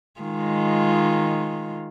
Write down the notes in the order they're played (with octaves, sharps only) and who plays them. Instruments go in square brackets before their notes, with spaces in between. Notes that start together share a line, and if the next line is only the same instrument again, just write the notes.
[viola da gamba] D#3 G#3 F4